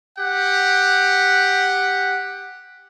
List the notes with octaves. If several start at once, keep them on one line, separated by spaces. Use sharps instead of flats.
G4 F#5